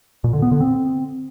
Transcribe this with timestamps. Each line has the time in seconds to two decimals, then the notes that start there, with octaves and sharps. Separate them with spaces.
0.24 A#2
0.33 D3
0.42 B3
0.51 D3
0.60 C4